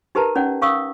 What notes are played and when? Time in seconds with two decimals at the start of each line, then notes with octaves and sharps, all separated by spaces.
0.15 D#4 G4 A#4 B4 A5 A#5
0.36 C#4 D#4 D5 F#5
0.61 C#4 F5 C#6 D#6 E6